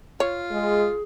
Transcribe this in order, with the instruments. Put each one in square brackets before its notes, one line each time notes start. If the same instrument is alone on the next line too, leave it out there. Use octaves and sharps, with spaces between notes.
[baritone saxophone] F4 [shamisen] C#5
[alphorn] G#3 [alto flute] G#4